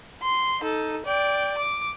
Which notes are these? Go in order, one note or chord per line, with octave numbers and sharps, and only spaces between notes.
C6
D#4 A4
D5 G5
D6